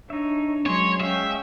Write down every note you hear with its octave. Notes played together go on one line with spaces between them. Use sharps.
D4 D#4 C#5 E5
F#3 G#3 C#4 C#5 D#5 C6
G#3 C#4 E5 F5 G5